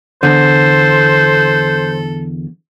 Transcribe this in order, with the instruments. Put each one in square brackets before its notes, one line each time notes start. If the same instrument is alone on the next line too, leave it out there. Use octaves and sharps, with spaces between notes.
[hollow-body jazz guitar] E2 D3 [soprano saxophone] A4 [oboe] C5